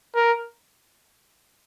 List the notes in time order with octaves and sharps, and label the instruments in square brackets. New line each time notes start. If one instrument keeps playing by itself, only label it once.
[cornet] A#4